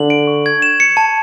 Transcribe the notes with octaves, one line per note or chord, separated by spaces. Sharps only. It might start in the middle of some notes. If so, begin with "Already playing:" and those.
Already playing: D3 F#7
D7
C#6
G#6
E7
C#7
A5